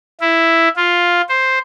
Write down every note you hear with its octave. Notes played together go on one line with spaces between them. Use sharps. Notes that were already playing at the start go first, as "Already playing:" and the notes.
E4
F4
C5